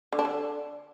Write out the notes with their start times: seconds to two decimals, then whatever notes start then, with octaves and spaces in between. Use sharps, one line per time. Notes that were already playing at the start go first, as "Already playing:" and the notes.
0.13 D3
0.19 D4
0.25 D3